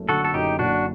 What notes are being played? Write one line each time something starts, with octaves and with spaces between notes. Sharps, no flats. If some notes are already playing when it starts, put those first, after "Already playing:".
Already playing: F#1 F#2 A3
D3 F#4 A4
A4
F#2 D#4 G4
F#1 D4 F#4